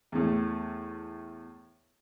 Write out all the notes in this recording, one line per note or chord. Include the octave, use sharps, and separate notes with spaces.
E2 A2